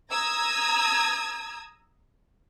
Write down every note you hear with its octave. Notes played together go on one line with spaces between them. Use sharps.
A#5 D#6 E6 G#6